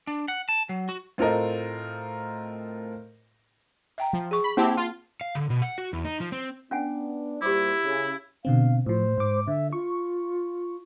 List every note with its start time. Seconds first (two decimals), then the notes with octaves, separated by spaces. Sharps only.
0.07 D4
0.28 F#5
0.49 A5
0.69 F#3
0.89 F#4
1.18 A2 C4 F4 A4 A#4 D#5
3.98 E5 G5 A#5
4.13 F3
4.31 G#4 C#6
4.44 B5
4.57 A#3 C4 E4 G4 A5
4.77 F4
5.21 F5
5.35 D3
5.50 B2
5.62 F#5
5.78 F#4
5.93 E2
6.05 D#4
6.20 F3
6.32 C4
6.71 B3 C#4 D4 F#5 G#5
7.42 A#2 G3 E4 G4 C5 D6
7.84 C#3
8.45 B2 D3 C4 F5
8.86 A2 F3 C5
9.18 G#2 D6
9.48 D3 E5
9.73 F4 C#6